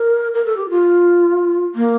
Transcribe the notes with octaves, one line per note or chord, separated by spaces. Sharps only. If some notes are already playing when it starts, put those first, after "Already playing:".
Already playing: A#4
A#4
A4
G4
F4
A#3